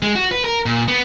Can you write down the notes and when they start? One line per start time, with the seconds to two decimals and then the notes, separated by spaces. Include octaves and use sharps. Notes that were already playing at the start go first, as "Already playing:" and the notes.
0.02 G#3
0.15 F#4
0.31 B4
0.44 A#4
0.66 A#2
0.88 B3